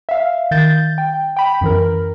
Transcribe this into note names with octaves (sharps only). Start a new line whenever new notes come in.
E5 F5
D#3 G6 A6
G5
G5 B5
F#2 E3 A#4